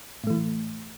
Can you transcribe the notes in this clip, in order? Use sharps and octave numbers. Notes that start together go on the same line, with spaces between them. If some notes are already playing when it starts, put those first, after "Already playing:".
A2 E3 A3